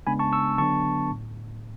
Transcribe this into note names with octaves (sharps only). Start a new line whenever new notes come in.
C#3 G#3 B3 D4 G#5 B5
A5 C#6
C#6 E6
D3 F#3 B3 D4 A5 C#6
A2